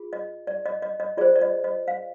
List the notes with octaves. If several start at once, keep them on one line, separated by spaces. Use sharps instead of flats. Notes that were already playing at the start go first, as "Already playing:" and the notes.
Already playing: F4 G#4
D#5
D5
D#5
D#5
D#5
F4 G#4 C5 D5
D5
D#5
D#5
F5